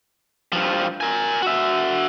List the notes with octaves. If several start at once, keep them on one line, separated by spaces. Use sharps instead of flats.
G2 F3
A#4 G#5
F#4 E5